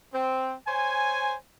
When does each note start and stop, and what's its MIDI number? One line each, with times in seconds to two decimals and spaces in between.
0.13 0.55 60
0.68 1.34 72
0.68 1.34 73
0.68 1.34 80